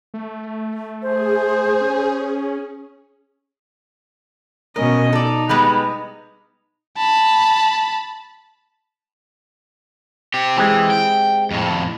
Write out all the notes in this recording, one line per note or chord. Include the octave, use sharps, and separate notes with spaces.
A3
G#4 C5
C#4
B2 C#4 A#4 D#5
D#4 A4 D5
G3 G#3 B3
A5 B5
C4 G4
E3 G#3 C4 G4
G5
F2 A2